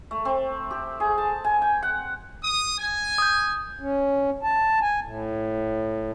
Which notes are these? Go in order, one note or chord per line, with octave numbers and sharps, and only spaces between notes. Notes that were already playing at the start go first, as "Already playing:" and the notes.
A3
C4
G4
G#4
A5
G#5
G5
F#5
D#6
G#5
D#6 G6
C#4
A5
G#5
A2